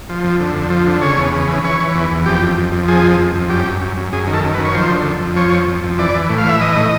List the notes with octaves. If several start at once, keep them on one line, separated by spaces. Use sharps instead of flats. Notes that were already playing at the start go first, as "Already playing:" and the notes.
F3
F2
D3
F2
F3
D3
C#3 C#5
E2
C#3
E3
E3 C#5
E3
E2
E2
F2 G4
F2
F2
F2
F3 G#4
F2
F2
F2
F#2 G4
F#2
F#2
F#2
F#2 G#4
D#3
A4
F#2
B4
D#3
C#5
F3 C5
D3
F2
F2
F3 C#5
F2
F2
F2
E3 D5
E3
A2
F5
E3 E5
E3 D#5
A2